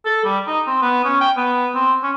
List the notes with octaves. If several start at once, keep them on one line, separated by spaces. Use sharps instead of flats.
A4
G3
D#4
C4
B3
C#4
G5
B3
C4
C#4